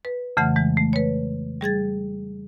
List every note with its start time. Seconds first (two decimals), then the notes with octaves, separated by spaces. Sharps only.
0.05 B4
0.37 F2 C#3 E3 A3 F#5 F6
0.56 E3 G#3
0.77 A3
0.93 B4 C#5
1.61 G3 G#4 G#6 A6